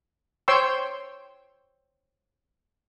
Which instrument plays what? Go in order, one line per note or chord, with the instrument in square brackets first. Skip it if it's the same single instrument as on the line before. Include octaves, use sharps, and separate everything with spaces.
[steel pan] C5 C#5 G5 C6 C#6 E6